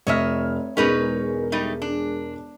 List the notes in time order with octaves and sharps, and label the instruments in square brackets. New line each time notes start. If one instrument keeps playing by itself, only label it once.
[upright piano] F1 F6 [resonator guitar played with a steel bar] C#5 D#5 E5
[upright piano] E1 G#3 A#4 [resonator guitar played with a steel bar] C#4 D#4 B4
[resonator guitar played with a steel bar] G3 A3 D#4
D4